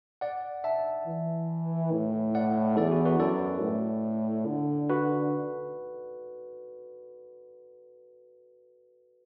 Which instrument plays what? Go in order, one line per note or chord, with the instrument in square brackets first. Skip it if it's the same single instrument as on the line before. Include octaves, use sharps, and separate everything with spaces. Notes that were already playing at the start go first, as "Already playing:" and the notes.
[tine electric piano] D5 F#5
E5 A5
[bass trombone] E3
A2
[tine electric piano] D5 F#5
[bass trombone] E2 [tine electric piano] A4 D5
[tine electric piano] F#4
F#4 B4
[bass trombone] F#2 [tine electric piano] A4 D5
[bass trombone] A2
D3
[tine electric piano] F#4 B4